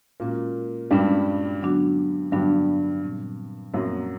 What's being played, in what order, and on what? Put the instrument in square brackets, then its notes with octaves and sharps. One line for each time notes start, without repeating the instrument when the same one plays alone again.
[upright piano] A#2 A#3 [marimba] G#3 C#4 F#4
[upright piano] G2 G3 [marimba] G#3 C#4 F#4
[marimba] D3 F#3 B3 D4 F#4
[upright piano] G2 G3 [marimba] D3 F#3 B3 D4 F#4
[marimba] A#2 G3 C4
[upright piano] F#2 F#3 [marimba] A#2 G3 C4